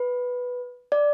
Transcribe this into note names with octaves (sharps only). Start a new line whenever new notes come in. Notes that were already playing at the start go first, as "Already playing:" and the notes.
Already playing: B4
D5